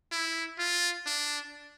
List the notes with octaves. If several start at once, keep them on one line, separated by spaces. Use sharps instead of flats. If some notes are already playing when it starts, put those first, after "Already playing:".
E4
F4
D4